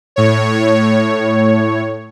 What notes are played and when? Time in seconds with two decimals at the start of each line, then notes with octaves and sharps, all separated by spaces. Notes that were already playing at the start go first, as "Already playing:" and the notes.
0.16 A2 C#5